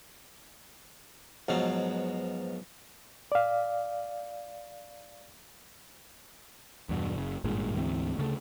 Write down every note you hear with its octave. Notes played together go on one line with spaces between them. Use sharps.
G#2 B2 F3 F#3
D5 F5
E2 G2 B2
F#1 C#3
G#1 G2 A#2 G#3
D2 G#2 E3 C4
D2 C#3 A3